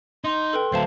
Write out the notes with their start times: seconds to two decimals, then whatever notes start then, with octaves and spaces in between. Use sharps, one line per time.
0.24 D#4 C6
0.53 A4 B4 G5
0.72 D2 F#3 C5 F5 A5